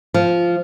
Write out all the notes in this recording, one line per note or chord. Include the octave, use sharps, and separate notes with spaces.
F3